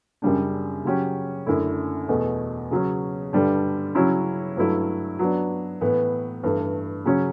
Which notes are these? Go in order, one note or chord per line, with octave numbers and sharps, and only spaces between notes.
F#2 C#3 G3 D4
C#3 F#3 C#4 G4
F#2 D3 A3 E4
E2 B2 A3
C#3 F#3 C#4
G2 D3 G3 D4
C#3 F#3 C#4 E4
G2 F#3 A3 E4
F#3 B3 D4
A2 E3 B3
G2 E3 A3
C#3 F#3 C#4